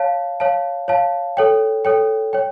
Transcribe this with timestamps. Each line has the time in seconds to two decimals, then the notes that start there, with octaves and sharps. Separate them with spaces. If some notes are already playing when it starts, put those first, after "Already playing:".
Already playing: C#5 F5 A5
0.40 C#5 F5 A5
0.88 C#5 F5 A5
1.37 A4 C#5 G5
1.85 A4 C#5 G5
2.33 C#5 G5